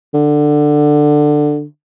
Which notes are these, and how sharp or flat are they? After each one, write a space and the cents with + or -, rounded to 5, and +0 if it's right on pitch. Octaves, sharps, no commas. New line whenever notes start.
D3 +15